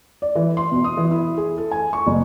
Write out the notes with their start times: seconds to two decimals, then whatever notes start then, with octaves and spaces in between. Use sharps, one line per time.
0.22 D5
0.35 E3
0.57 C6
0.72 B2
0.84 D#6
0.97 E3
1.11 E4
1.38 G#4
1.58 A4
1.71 G#5
1.93 C#6
2.07 F#1